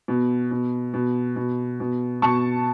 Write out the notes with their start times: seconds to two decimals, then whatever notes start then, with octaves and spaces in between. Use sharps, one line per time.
0.08 B2
0.51 B2
0.94 B2
1.36 B2
1.80 B2
2.22 B2 A5 C#6